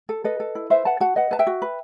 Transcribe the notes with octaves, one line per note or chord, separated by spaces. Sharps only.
A4
A4 B4 D#5
A4
E4
B4 C5 E5
B4 F#5 A5
F#4 F#5 A5
B4 D#5 F#5
B4 A5
E5 G5
F#4
B4